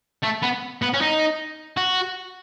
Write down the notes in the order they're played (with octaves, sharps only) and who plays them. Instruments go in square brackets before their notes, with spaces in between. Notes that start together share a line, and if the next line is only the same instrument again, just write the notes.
[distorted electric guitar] A3
B3
B3
C#4
D#4
F#4